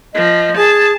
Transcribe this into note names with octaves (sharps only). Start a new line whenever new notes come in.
F3 D#5
G#4 A5